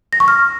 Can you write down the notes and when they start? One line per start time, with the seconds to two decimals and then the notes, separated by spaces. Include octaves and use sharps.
0.13 A#6
0.20 C#6
0.28 F6